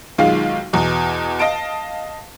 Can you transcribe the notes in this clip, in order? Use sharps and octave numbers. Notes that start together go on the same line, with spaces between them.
B1 D#3 G#3 F4 F5
E2 B2
D#5 F5 A5 D7